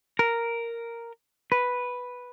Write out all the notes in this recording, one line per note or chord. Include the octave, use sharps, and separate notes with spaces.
A#4
B4